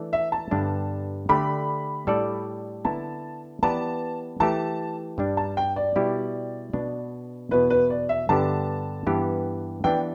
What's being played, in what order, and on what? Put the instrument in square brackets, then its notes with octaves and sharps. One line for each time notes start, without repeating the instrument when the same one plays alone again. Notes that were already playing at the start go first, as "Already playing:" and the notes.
Already playing: [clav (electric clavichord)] E3 A3 D4 A4 D5
[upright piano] E5
A5
[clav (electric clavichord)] G2 D3 G3 B3 D4
[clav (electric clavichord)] D3 A3 G4 D5 [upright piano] B5
[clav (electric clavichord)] A2 G3 D4 A4 D5
[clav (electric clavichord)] D3 B3 E4 [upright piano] A5
[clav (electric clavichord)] E3 B3 G4 B4 D5 [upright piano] A5
[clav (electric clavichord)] E3 A3 G4 [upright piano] A5
[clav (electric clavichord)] G2 G3 D4
[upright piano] A5
G5
D5
[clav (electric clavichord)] B2 G3 E4 G4
B2 B3 D4
[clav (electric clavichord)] E2 B2 B3 E4 [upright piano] B4
[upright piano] B4
D5
E5
[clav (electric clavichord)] G2 D3 B3 G4 [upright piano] A5
[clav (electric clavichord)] G2 E3 B3 G4 B4
[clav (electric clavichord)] E3 B3 D4 G4 [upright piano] G5